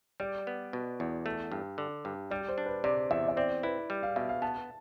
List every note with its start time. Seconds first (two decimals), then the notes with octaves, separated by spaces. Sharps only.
0.20 G3 D5
0.47 B3
0.73 B2
1.00 E2
1.26 A3
1.52 G2
1.78 D3
2.05 G2
2.31 G3 D5
2.49 C5
2.58 D4
2.66 B4
2.84 C3 D5
3.11 E2 E5
3.28 E5
3.37 C4 D5
3.63 E4 B4
3.90 G3
4.03 F5
4.16 B2 E5
4.29 F5
4.42 B3 A5